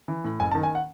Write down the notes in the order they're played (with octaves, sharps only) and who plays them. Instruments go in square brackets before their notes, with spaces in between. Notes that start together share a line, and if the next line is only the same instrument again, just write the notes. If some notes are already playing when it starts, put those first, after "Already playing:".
[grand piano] E3
A2
F#1 G#5
A5
D#3
G#5
F#5